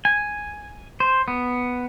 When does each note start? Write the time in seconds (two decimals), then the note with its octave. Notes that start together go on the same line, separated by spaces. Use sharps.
0.05 G#5
1.00 C5
1.28 B3